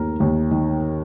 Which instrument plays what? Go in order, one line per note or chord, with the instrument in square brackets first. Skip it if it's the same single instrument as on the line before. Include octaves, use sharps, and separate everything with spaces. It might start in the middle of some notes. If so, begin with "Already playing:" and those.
Already playing: [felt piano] D#2 D#3 A#4
D#2
D#3